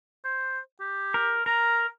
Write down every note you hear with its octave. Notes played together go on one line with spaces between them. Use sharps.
C5
G4
A#4
A#4 A#5